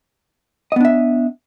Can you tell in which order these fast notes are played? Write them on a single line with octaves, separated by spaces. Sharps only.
D#5 B3 D4 E5